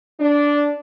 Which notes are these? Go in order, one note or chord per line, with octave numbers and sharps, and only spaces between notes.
D4